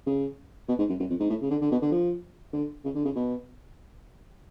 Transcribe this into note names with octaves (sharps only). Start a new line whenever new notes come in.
C#3
B2
G#2
F#2
F#2
F2
G#2
A2
C#3
D3
D3
B2
D3
F3
D3
C#3
D3
C#3
B2